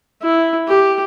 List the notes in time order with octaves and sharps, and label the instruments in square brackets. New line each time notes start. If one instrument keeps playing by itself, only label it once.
[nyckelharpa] E4
G4